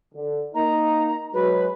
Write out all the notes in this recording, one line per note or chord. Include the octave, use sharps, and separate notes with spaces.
D3
A#3 D#4 A#5
F#3 G#3 B4